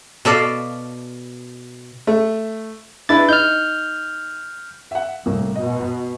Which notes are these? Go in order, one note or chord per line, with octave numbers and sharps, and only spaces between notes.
B2 A4 D5 F5
A3
D4 E4 B4 A6
D#4 F6 G6
E5 F#5
C2 A2 A#3
B2 D#5